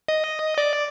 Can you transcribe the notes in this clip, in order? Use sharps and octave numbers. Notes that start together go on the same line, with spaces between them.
D#5
D5